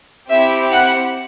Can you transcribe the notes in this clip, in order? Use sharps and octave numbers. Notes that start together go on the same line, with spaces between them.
C4 E4 G4 E5
F#5